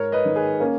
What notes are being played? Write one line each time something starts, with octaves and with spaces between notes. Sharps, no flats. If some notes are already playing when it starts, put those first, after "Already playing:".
Already playing: G#2 A#4 C#5
B4 D#5
D#3
G#4 B4
A#3 C#4